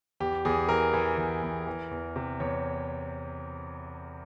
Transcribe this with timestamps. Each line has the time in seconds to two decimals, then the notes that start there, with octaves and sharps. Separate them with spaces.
0.20 E2 G4
0.45 E2 G#4
0.69 E3 A#4
0.93 E3
1.18 E2
1.43 E2
1.67 E3
1.91 E2
2.16 C3
2.40 E2 C#5